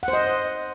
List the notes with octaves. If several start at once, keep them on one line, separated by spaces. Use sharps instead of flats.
F#5
C5
D#5